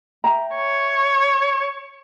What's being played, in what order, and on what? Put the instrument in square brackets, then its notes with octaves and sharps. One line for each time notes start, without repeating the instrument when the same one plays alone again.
[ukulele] E5 G5 A#5
[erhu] C#5